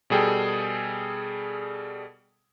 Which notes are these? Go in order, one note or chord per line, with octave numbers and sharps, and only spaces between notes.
B2 G3 G#4 A4 G5